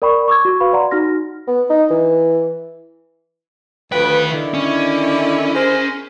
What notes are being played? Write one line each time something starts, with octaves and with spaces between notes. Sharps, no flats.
A#4 D5 G5 B5 C#6
C#6 D6 E6 G#6
F#4 C#6
F#4 B4 F5 B5 C#6
D5 F#5 A#5 C6
D#4 F#4 F6 A#6
B3
D#4
E3
D2 D#3 F3 B4 G5
D3 D#3 E4
C#4
G#4 A#4 C5